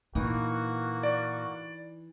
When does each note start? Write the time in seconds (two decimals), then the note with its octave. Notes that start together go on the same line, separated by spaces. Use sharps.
0.15 A#2 E3 A#3 D#4 F#4
1.03 D5